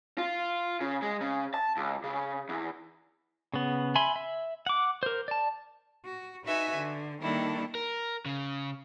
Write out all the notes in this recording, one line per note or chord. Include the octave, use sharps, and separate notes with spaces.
F4
C#3
G#3
C#3
A5
C#2
C#3
E2
C#3 B3
E5 G#5 B5 C6
E5
F#5 D6
A#4 C5
D5 A5
F#4
D#4 F#4 B4 E5 G#5
D3
D#3 G3 A#3 D4 E4 A4
A#4
C#3